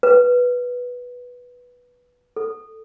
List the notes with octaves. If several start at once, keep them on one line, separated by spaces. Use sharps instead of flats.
B4
A4